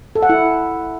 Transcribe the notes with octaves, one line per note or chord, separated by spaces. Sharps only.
A4
F#5
E4